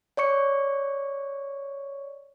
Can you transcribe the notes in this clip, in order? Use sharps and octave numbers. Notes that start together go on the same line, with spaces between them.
C#5 D5 C#6 C#7